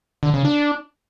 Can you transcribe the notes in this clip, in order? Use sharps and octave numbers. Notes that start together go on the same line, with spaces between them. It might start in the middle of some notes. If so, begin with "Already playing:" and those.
D3
C#3
D4